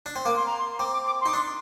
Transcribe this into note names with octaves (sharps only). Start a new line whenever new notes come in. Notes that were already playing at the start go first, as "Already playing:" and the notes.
D4
C4
A#3 D6
C6
A#5
C6
C4 D6
D6
D6
C6
D#4 D6
D4 C6